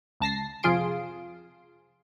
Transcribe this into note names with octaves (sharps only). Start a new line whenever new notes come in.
C#2 A5 A#6 C7
C2 F2 F4 G#4 C6 D7